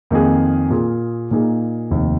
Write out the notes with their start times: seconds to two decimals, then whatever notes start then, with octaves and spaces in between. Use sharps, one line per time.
0.11 F2 D#3 A#3 D#4 G#4
0.70 A#2 A#3 F4 G#4
1.31 A#2 A#3 D#4 G#4
1.91 F1 D#2 D#3